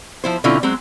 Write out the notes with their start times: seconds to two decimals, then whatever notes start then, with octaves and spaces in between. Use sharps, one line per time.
0.24 F3 E4 C5
0.44 B2 D3 C4 C#4 E4 F4
0.63 F#3 G#3 C4